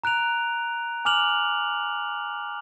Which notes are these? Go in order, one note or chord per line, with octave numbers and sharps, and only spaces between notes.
A#5 F#6 D7 F7
G#5 D6 F6 F7 F#7